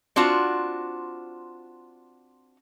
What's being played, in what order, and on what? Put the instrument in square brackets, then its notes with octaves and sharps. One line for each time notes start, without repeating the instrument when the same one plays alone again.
[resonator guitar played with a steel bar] C4 D4 F4 F#4